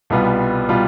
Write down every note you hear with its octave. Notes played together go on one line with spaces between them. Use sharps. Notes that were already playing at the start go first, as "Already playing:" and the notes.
C2 B2 G3 B3 F4
B2 G3 B3 F4